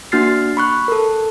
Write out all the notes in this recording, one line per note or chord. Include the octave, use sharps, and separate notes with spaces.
A#3 D4 F#4 F6 A6 C7
B5 C#6 F#6
A4 A#4